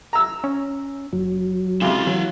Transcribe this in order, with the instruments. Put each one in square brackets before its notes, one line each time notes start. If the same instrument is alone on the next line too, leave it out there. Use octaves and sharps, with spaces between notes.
[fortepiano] A#5 E6
[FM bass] C#4
[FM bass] F#1 [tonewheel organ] F#3
[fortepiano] C#2 C3 [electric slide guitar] E4 F5
[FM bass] E3 [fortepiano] F#3